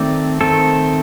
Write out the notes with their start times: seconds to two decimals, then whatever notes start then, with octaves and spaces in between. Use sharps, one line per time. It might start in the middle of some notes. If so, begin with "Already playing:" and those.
Already playing: D#3 A3 C4 D5
0.41 D#3 A3 C4 A4